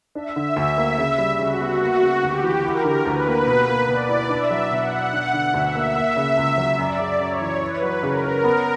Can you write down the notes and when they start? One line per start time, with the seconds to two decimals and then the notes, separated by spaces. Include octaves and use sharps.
0.15 D4 E5
0.36 D3
0.56 D2
0.77 A#3
0.98 C#3
1.18 G3
1.39 C#3 F#4
1.61 B3
1.81 A#3 F#4
2.02 C#3
2.23 D2 G4
2.43 E3
2.64 E4 A#4
2.84 D3
3.05 D2 B4
3.27 A#3
3.47 B2
3.68 A#3
3.88 B2 D5
4.09 E4
4.29 D4 E5
4.50 F#3
4.71 B2 F#5
4.92 B3
5.13 D4
5.34 D3
5.54 D2 E5
5.75 A#3
5.96 A#3
6.16 C#3
6.37 C#2
6.58 F#3
6.78 F#2 D5
6.99 C#3
7.20 F#2 C#5
7.41 E3
7.61 E4 B4
7.82 F#3
8.03 C#3 A#4
8.24 C#4
8.44 B3